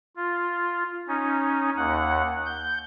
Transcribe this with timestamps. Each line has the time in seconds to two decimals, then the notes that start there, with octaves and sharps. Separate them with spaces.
0.16 F4
1.08 C#4 D#4
1.76 D#2 F#5
2.46 G6